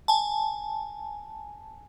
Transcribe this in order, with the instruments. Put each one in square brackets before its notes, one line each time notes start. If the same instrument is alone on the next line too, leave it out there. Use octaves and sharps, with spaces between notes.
[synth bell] G#5 A5